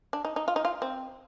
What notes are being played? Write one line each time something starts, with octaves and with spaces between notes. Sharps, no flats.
D4
D#4
D#4
F4
D#4
F4
C4